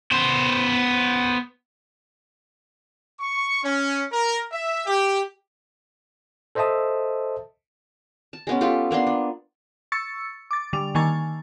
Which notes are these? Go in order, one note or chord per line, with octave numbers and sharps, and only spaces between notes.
B3 C5
C#6
C#4
A#4
E5
G4
A4 C5 D#5 E5 A5 D#6
A5
G#3 B3 C#4
F4 G4 A4 B4
A#3 B3 D4 C6
D4
C#6 E6 A6 C#7
D6 A6
D3 G3 D6 F7
D#3 A#3 G#5 C#6 A6